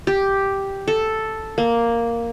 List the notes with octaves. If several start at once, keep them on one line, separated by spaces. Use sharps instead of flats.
G4
A4
A#3